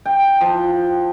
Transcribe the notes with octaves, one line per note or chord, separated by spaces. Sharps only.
G5
F3